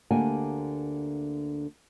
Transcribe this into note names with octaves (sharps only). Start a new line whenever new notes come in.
D2 D3 A#3 G4 F#5 G#5